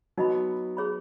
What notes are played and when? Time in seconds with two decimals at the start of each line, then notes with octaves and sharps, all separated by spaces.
0.17 F#3 B3 D#4 F#4 D#5 B5
0.77 G#4 C#5 B5